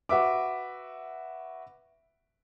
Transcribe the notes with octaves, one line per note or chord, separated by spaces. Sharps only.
F#4 B4 E5 D6